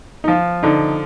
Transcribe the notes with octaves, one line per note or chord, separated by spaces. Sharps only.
D#4
F3 F4
D3 D#4